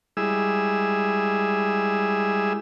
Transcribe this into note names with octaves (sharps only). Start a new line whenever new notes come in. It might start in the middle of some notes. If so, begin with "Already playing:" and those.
G3 G#3 E4 G#4 E6